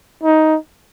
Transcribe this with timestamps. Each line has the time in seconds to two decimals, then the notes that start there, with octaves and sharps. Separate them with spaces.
0.23 D#4